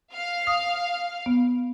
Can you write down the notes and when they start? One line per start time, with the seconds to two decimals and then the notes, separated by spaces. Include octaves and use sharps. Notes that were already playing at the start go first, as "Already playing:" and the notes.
0.13 F5
0.47 D#6
1.26 B3